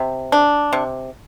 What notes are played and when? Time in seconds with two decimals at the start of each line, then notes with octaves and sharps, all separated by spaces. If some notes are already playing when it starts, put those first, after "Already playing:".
Already playing: C3
0.32 D4
0.73 C3